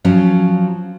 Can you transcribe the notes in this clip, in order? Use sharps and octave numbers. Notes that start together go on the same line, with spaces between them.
F3 F#3 C#4